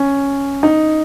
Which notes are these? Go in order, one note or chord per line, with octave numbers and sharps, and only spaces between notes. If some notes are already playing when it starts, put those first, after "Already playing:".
Already playing: C#4
D#4